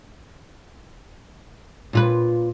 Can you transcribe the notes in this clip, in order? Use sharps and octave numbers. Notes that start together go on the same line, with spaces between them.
A#2 F4 B4